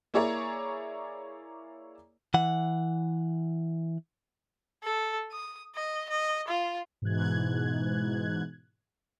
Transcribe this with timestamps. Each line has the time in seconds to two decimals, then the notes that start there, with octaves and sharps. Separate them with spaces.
0.14 A#3 E4 G#4 C#5 D5 A#5
2.34 E3 F#5
4.83 A4
5.32 D#6
5.75 D#5
6.10 D#5
6.48 F4
7.02 G#2 B2 E3 F#6 G#6